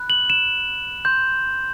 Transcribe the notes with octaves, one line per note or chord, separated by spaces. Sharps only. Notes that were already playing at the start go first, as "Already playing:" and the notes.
Already playing: B5 F#6
F#7
E7
C6 G6